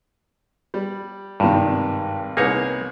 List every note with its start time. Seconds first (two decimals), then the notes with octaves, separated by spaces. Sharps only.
0.74 G3
1.40 G#1 G2 C3 D#3
2.37 C2 A#3 B3 D#4 G#4 C#5